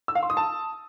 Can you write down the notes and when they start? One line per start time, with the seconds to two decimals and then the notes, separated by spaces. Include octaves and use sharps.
0.08 E6
0.15 F5
0.23 C6
0.30 D#6
0.37 A5